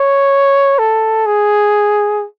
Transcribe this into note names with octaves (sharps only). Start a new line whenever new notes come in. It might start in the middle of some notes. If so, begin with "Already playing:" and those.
Already playing: C#5
A4
G#4